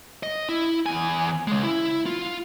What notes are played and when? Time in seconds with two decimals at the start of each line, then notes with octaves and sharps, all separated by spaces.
0.23 D#5
0.49 E4
0.86 E2 G#5
1.48 C#3 G#3
1.63 E4
2.06 F4